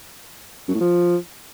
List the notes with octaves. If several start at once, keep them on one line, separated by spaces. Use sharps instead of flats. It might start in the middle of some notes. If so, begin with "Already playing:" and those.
F#2
A2
F3